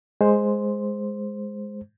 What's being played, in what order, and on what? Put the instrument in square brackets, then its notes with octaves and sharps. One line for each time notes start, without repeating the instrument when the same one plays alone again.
[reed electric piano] G#3 C5